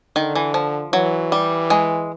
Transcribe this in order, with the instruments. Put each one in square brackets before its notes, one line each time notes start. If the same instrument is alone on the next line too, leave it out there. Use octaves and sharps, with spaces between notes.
[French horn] D3 [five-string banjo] D#3
[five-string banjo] E3
F3
[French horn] E3 [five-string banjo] F#3
[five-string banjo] G3
G#3